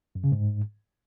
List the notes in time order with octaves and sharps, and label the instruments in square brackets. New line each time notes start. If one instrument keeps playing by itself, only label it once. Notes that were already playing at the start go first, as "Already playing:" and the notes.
[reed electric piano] F#2
C#3
G#2